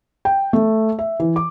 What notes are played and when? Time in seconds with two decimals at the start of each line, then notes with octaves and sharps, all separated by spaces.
0.25 G5
0.53 A3
0.99 E5
1.20 E3
1.36 D6